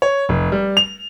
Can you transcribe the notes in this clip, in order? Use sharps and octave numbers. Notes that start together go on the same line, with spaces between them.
C#5
F1
G3
F7